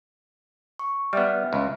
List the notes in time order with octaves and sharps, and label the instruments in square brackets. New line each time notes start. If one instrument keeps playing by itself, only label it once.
[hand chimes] C#6
[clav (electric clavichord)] G3 B3 [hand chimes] E5 F6
[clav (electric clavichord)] C#2